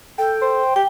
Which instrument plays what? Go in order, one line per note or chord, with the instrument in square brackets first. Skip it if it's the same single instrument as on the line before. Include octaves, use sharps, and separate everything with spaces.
[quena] A4 [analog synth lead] G5
[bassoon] C5
[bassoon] G4 [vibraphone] G5